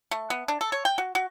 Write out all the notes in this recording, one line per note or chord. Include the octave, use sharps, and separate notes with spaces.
A3
B3
D4
A4
C#5
G5
F#4
F#4